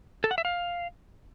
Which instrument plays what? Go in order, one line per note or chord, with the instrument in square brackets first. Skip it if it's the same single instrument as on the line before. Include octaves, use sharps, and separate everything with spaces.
[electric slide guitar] A4
F#5
E5
F5